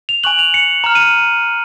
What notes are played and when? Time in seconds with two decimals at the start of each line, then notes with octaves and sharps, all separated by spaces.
0.09 F7
0.24 G#5 C#6 F#6 F#7
0.39 F7
0.54 C#7
0.84 A#5 F6
0.95 D#7